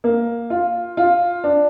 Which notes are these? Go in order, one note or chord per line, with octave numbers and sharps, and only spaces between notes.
A#3
F4
F4
D4